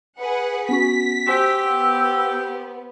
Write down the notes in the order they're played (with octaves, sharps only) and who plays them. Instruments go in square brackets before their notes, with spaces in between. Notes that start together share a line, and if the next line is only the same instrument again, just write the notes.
[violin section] G#4 B4 F#5
[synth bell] B3 C#4 F#4 [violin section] B6
[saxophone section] G4 [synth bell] C5 G#5 C6 [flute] E6
[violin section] B3